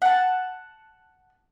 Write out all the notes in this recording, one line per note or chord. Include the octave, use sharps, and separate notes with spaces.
F#5 A5